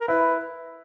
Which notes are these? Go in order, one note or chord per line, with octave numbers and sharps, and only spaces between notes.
A#4
E4 B4